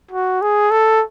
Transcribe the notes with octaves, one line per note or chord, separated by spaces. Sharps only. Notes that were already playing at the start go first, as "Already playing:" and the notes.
F#4
G#4
A4